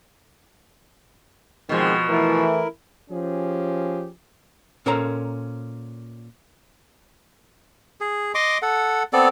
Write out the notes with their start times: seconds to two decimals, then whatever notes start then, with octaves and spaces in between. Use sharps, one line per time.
1.69 B2 D#3 F3 G#3 C4
2.08 E3 A3 E4 A#4
3.10 F3 C#4 G4 G#4
4.86 A#2 C#4 A4 A#4 C5 A#5
8.01 G#4
8.35 D#5 C6 D6
8.62 A4 F#5
9.13 B3 C4 A4 D5